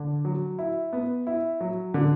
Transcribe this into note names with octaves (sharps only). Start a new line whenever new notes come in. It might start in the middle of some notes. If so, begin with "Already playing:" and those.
Already playing: D3
F#3
E4
B3
E4
F#3
D3